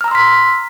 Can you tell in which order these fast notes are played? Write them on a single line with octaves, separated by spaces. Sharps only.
F6 A#5 E6 C6 B6